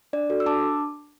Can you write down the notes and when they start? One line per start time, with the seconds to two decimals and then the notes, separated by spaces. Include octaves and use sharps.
0.13 D4 D5
0.30 F#4 A4
0.40 E6
0.46 D4 A5 D6